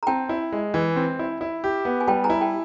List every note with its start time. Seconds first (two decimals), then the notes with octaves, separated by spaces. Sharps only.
0.03 A#5
0.07 C4 G5 A5
0.29 E4
0.52 G#3
0.74 E3
0.96 C4
1.19 E4
1.41 E4
1.64 G4
1.85 B3
2.01 G#5
2.08 G3 G5 A5
2.24 G#5 A#5
2.30 E4
2.41 G5 A5